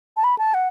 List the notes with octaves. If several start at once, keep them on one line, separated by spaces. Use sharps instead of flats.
A5
B5
A5
F#5